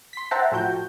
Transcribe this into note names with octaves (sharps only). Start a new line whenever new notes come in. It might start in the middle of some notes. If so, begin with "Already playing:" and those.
C6 B6
C5 E5 F#5 G5 A5 A#5
A2 F3 F#4 G5 G6